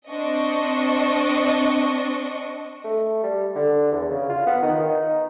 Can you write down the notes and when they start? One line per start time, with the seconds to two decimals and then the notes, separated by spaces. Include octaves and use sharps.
0.10 C4 D4 D#5 C#6
2.84 A3
3.23 G3
3.56 D3
3.92 E2
4.10 C#3
4.30 F4
4.47 B3
4.63 D#3
4.89 D#4